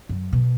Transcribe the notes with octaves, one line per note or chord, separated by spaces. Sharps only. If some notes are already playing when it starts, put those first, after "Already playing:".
F#2
B2